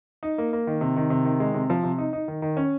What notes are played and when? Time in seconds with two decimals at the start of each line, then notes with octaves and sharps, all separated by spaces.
0.23 D#4
0.38 A#3
0.53 A#3
0.67 D#3
0.81 C3
0.96 D#3
1.10 C3
1.25 D#3
1.40 G#3
1.54 C3
1.70 F3
1.83 C3
1.98 D#4
2.13 D#4
2.28 D#3
2.42 D#3
2.57 C#4